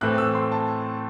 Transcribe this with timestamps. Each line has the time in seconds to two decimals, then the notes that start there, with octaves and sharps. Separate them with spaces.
0.01 A2 E3 A3 C4 F#6
0.18 E6
0.35 C6
0.52 A5